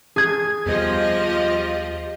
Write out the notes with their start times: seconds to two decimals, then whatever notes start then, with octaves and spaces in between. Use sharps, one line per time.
0.16 G#4 G#6
0.66 D#2 F3 G3 B3 G4 D#5